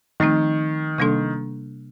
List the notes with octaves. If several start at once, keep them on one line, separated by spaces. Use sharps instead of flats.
D#3 F3 A3 C4 D#4
C3 G3 A#3 D4 A4